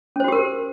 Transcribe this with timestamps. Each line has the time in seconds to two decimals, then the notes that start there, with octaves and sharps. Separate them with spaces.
0.16 C#4
0.20 C5
0.24 F#4
0.28 G4
0.32 A#4